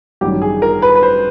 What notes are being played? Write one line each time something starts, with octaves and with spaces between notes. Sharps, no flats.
A1 G2 D#3 F#3 G4
G#4
A#4
B4
B4
C5